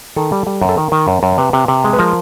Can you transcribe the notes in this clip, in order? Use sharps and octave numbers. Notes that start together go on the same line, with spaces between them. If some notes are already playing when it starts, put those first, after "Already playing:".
D#3 A4
G3
G3
F#2
A4
D#3 A#4
D#3
F#2
F#2
C3 B4
C3
C3
G#3
B4
F3 A#4